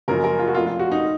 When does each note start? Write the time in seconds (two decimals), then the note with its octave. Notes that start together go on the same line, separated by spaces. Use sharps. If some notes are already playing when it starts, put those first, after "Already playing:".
0.08 F#1 F#2 F3 G#3 A#4
0.24 A#4
0.39 F4
0.48 F#4
0.55 F1 F2 F3 F4
0.67 F4
0.79 F#4
0.92 D#4